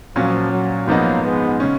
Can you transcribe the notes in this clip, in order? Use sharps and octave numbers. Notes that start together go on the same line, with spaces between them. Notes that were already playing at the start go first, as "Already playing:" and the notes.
A#2 F3 F#3 C#4
F#3
G#2 F3 F#3 A#3 B3 D#4
G#3 B3
C#3 G#3 C#4